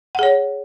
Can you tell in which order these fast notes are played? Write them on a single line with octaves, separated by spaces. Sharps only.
F#5 G#4 C#5